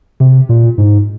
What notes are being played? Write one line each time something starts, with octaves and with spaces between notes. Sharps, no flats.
C3
A#2
G#2